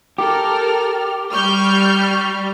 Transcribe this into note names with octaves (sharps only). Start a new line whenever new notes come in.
G4 A4 A#4 F6
G3 C#6 F6 G6